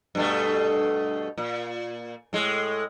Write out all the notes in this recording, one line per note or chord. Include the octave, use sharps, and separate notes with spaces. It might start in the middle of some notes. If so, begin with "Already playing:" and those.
G2 B2 A3
A#2
A2 G#3